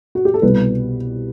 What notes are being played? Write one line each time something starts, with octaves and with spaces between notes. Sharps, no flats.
F#4
G4
A4
C2 B2 G3 B4